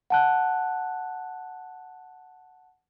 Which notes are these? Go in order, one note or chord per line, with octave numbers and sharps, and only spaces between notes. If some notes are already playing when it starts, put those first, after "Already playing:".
F#5 A5 F#6